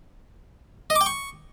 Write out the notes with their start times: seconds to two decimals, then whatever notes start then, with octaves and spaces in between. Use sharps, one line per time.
0.90 D#5
0.95 D6
1.01 G5
1.06 C#6